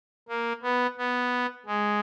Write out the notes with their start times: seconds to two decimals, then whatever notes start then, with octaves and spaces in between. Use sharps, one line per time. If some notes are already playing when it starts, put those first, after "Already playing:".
0.28 A#3
0.62 B3
0.98 B3
1.66 G#3